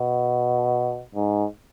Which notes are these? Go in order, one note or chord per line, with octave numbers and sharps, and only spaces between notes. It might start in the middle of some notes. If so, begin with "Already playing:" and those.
Already playing: B2
G#2